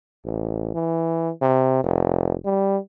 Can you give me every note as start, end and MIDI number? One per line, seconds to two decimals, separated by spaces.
0.25 0.73 33
0.74 1.30 52
1.41 1.79 48
1.84 2.34 29
2.45 2.77 55